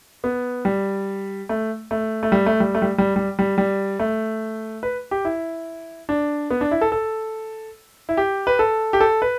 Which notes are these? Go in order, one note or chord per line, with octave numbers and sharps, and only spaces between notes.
B3
G3
A3
A3
A3
G3
A3
G3
A3
G3
G3
G3
G3
G3
A3
B4
G4
E4
D4
B3
D4
E4
A4
A4
E4
G4
B4
A4
G4
A4
B4